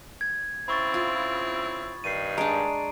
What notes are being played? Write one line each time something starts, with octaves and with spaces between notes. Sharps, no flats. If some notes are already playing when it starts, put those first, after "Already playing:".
G#6
C#3 C4 E4 B5 C#6 A6
F4 D#6
G2 D#3 C7 D#7
G#3 D4 A#5 D7